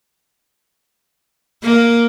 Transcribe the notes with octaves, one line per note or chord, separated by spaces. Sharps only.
A#3